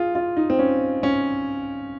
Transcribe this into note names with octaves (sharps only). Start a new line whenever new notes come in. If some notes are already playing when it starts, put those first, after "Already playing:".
Already playing: F4 G#4
F4
D#4
C4
C#4
C#4